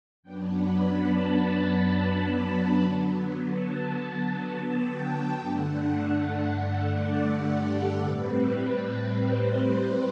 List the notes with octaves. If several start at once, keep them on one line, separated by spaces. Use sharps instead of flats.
F#2 F#3 B3 D4 G5
B5
A5
B5
D3 F#3 B3
A5
G5
G2 D3 A3 D4 F#5
D5
G4
A4
A2 G3 C4 B4
C5
C5